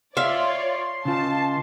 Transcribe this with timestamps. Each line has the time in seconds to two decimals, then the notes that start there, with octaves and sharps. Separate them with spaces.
0.17 F4 C#5 D5 E5 F5 C6
1.05 C#3 F4 A5